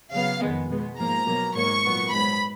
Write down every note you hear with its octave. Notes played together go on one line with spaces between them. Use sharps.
C#3 F#3 B3 F5
F2 D#3 G#3 B3
B2 G#3 B3
G#2 F3 A#3 A#5
B2 F#3 A#3
G#2 D#3 F#3 A#3 C#6
A#2 F#3 B3
G#2 F#3 B3 B5